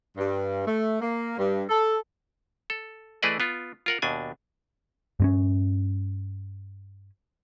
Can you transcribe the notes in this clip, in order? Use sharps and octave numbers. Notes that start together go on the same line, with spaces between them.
G2
A3
A#3
G2
A4
A4
E3 A3 G#4 B4 D5 D#5
B3 F4
F4 A#4 F#5
D#2 B2 D4 G#5
G2 C4 C#4